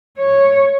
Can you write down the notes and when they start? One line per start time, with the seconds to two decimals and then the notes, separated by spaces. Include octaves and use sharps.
0.18 C#5